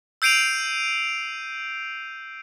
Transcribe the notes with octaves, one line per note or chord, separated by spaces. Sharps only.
E6 G6 C7 D7 D#7 F7